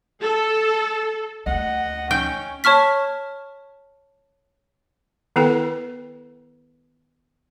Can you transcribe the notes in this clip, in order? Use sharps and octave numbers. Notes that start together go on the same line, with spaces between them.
A4
D2 D#5 F#5
C#4 G5
C#5 A5 C#6 F6 B6
D#3 B3 E4 A4 B4 G5